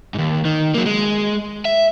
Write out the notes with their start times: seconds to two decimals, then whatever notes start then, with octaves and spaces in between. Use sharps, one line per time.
0.14 D#2 G#2
0.45 D#3
0.74 F#3 A#3
0.86 G#3
1.65 E5